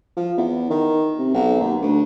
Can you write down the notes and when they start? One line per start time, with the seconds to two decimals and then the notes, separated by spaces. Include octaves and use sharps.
0.17 F3
0.38 E2
0.70 D#3
1.18 C3
1.34 B1
1.60 D#2
1.82 D2